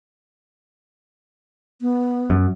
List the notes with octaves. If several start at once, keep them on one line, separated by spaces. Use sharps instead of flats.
B3
F#2